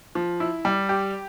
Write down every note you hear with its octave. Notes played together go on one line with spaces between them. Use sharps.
F3
E4
G3
G4